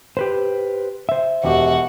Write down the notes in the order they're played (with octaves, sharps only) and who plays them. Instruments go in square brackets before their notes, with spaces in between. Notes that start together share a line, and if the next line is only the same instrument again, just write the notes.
[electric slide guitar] G4 B4 C5
C5 E5
[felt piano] E1 G4 [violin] F#4